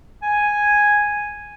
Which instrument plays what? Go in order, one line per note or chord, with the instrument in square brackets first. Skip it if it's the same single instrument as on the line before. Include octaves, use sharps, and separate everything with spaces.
[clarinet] G#5